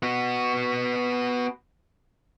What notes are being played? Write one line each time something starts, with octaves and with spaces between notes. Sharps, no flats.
B3 F#4